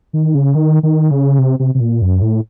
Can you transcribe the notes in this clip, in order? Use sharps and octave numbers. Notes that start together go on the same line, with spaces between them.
D#3
C#3
D#3
D#3
C#3
C3
C3
C3
A#2
F#2
A2